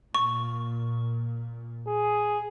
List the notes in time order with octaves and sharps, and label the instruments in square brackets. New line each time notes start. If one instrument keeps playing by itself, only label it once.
[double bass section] A#2 [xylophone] C#6
[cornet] G#4